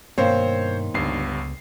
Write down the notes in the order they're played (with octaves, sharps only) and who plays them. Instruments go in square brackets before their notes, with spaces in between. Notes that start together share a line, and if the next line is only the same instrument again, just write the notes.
[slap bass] G2 B2 G3 [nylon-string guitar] D#3 A#3 C4 [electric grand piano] C5 C#5
[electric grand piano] G1 G2 C7 [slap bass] C#2 B3